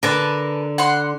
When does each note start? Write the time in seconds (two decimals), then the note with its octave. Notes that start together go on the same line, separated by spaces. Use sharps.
0.03 D3 A#4 B4 A5
0.78 F#5 C6